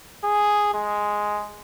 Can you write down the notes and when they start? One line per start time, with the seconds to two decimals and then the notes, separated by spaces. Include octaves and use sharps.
0.24 G#4
0.74 G#3